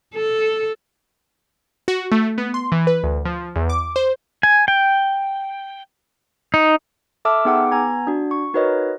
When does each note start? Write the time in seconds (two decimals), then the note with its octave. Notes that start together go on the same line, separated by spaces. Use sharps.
0.14 A4
1.88 F#4
2.12 A3
2.38 B3
2.54 C6
2.72 E3
2.87 B4
3.03 D2
3.25 F3
3.56 E2
3.69 D6
3.96 C5
4.43 G#5
4.68 G5
6.54 D#4
7.25 A4 E5 A5 D6 E6 F6
7.45 B3 D#4 G#4 F#5 G5 D6
7.71 B3 G#5 A#5 G#6
8.07 D4 F#4
8.31 C#6
8.54 D#4 F#4 A#4 B4 C#5 D#5